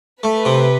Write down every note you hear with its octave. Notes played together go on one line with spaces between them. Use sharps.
A3 B4
C3